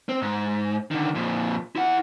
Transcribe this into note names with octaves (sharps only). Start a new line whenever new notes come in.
C4
G#2
D3 D#3
F2 A#2
E4 F#5